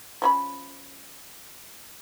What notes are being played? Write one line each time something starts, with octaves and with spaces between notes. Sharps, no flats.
F3 C#4 B5